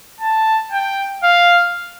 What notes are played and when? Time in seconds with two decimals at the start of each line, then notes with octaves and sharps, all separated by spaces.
0.21 A5
0.72 G5
1.23 F5